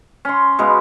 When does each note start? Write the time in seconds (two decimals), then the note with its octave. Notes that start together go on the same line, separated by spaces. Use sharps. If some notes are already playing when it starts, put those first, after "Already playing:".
0.25 C#4 C6
0.59 B2 G#3 B3 F5